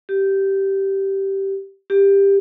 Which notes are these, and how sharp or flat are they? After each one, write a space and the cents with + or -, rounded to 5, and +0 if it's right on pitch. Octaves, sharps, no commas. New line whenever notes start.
G4 -10
G4 +15